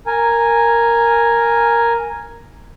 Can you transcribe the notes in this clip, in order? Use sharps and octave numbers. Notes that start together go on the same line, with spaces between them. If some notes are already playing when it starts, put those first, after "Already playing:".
A#4 G#5